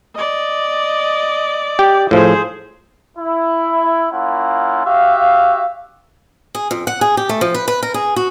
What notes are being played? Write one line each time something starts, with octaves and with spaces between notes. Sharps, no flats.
D5 D#5
G4
A2 F3 G#4 C5
E4
A#3 C#4 E4 F4 F#5
F#4 G4 E5 F5
G#4
F2
F#5
G#4
G4
A3
F3
B4
B4
A#4
G#4
F#4